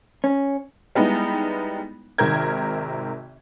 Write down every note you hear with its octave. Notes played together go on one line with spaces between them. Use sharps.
C#4
G3 G#3 B3 D#4 E4
G#1 C3 D#3 A#4 G6 G#6